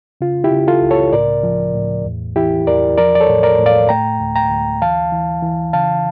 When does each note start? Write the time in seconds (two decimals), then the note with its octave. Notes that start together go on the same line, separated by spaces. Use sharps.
0.21 C#3 F4
0.44 E4 G4
0.52 C#3
0.68 F4 A4
0.82 C#2
0.91 A4 C#5
1.13 A2 A#4 D5
1.43 F3
1.74 A2
2.05 E2
2.36 E3 E4 G4
2.66 E2 A#4 D5
2.98 F3 A#4 D5
3.15 D5
3.20 A4 C#5
3.28 A2
3.43 A#4 D5
3.59 A2
3.66 D5 F5
3.89 A3 G5 A#5
4.20 D2
4.36 G5 A#5
4.50 D2
4.82 E3 F5 A5
5.12 E3
5.42 E3
5.73 C#3 F5 A5